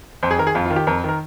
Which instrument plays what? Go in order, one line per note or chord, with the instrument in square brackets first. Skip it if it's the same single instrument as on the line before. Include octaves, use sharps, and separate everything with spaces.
[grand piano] F2 C5
G#4
D#3 A#4
G#4
F2 F4
F4
D#3
G4
F2 A#4
D#3 A#4